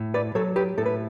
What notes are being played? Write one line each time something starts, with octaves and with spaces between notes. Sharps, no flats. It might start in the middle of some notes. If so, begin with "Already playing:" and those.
Already playing: A2
B4 D5
F#3 A4 C#5
G4 B4
A2 A4
B4